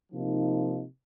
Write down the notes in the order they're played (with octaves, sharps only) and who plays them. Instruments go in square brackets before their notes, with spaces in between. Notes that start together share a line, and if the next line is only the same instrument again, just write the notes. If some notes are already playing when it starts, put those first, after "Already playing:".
[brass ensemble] C3 F3 A#3 D#4